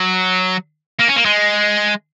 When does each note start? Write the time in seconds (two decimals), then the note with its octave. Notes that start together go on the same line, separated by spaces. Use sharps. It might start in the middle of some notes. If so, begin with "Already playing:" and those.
Already playing: F#3
1.00 A#3
1.08 C#4
1.16 A#3
1.25 G#3